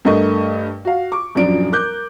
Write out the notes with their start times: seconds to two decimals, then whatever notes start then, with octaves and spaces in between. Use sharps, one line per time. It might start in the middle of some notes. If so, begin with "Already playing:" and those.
0.05 G2 A3 A#4 D#5 C#6
0.85 F#4 F5
1.12 C#6 D6
1.35 D#1 F#2 F3 F#3 D4 D7
1.72 A#4 D6 F#6 G6